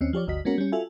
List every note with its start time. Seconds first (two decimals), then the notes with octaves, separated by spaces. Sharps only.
0.01 D#2 C4 C#4
0.13 F3 G4 C#5 D5
0.27 G1 D2 F#4 D#5 B6
0.45 G#3 A#3 B3 C#4 F#4 A#4
0.58 G3 C#4
0.72 F4 F#4 A4 E5 G#5